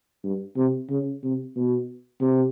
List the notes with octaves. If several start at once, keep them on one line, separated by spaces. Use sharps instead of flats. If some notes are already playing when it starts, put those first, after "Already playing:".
G2
C3
C#3
C3
B2
C3